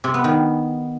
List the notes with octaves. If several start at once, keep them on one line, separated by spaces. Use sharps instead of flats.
C3
B3
D#3